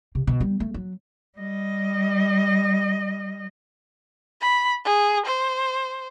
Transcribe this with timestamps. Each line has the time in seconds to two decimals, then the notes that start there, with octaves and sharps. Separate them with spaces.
0.15 C3
0.27 B2
0.41 G3
0.60 A3
0.74 F#3
1.38 G3 D#5
4.41 B5
4.85 G#4
5.26 C5